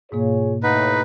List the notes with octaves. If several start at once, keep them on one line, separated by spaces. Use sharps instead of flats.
G#2 B2 A#3 F4 G#4 C#5
D#2 A2 D#4 B4 F#5